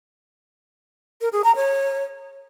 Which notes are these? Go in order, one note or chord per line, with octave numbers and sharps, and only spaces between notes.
A#4
G#4
A#5
C#5